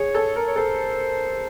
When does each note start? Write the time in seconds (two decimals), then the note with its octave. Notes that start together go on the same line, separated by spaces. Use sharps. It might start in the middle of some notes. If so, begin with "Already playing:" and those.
Already playing: G#4 C#5
0.14 A4
0.36 A#4
0.48 C#5
0.56 A4 C5